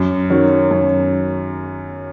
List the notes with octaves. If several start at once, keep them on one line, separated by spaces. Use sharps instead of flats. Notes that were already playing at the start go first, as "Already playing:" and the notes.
Already playing: F#2
D#3 F#3 C#4
F#2